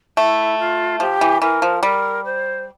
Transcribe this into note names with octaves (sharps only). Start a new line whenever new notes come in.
A3 E4
F4
F3 G4
E3
E3 A#4
F3
G3 A#4
C5